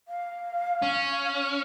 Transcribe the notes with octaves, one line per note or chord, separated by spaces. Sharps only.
F5
C#4